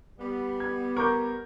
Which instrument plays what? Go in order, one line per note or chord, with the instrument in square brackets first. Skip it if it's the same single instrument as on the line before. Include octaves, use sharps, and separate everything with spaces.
[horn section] G3 B3
[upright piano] G#6
[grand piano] A#4 [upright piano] C#6 D6 G6